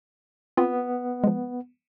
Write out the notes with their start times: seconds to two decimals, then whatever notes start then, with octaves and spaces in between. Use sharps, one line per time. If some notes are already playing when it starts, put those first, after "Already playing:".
0.57 B3 C4 F4
1.24 F3 G#3